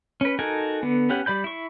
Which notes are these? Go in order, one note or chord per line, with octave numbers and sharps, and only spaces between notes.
C#4 B4
D#4 F#4 A4 A#4 G#5
D3 B3
B3 C#4 G4 F#5
G3 D5 B5 G6
E4 C#6